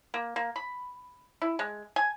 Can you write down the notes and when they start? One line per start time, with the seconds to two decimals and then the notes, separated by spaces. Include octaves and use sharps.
0.14 A#3
0.36 A#3
0.56 B5
1.42 E4
1.59 G#3
1.96 G#5